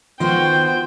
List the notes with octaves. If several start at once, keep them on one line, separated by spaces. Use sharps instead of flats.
D#3 B3 F4 F#4 C5 G5 C6